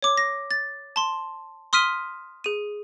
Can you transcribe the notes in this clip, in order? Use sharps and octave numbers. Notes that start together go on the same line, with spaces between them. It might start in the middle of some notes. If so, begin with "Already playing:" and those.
C#5 D6
A#6
A6
A5 C6
C6 D#6 F6 B6 D#7 G7
G#4 D#7